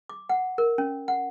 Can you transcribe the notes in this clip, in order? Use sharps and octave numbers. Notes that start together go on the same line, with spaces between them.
D6
F#5
A#4
C#4
F#5